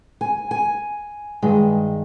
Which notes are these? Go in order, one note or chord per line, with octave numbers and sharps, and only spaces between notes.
G#5
G#5
G2 D#3 G#3